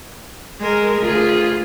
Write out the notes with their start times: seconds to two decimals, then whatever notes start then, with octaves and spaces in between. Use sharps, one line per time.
0.60 G#3 A#4
1.02 D2 F4 G#4